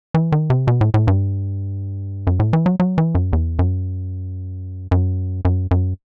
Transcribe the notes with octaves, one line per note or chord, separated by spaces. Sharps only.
E3
D#3
C3
B2
A2
A2
G2
F#2
A2
E3
F#3
F#3
E3
F#2
E2
F#2
F#2
F#2
F#2